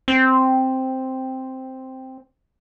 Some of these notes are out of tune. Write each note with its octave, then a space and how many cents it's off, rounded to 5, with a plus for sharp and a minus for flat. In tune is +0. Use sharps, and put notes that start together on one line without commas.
C4 +0